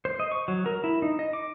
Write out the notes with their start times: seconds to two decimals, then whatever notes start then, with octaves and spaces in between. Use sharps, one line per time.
0.05 C5
0.20 D#5
0.31 C#6
0.48 F#3
0.66 A#4
0.84 E4
1.02 D#4
1.19 D#5
1.33 D6